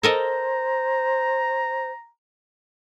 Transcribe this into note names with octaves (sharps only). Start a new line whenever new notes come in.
A4 A#4 C5 D#5 A#5